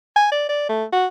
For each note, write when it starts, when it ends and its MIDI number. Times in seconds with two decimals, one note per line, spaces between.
0.16 0.29 80
0.32 0.49 74
0.49 0.65 74
0.69 0.84 57
0.93 1.07 66